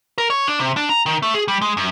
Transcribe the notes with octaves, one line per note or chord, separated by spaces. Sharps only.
A#4
C#5
D4
C3
D4
A#5
D#3
A3
G#4
G3
G#3
F#2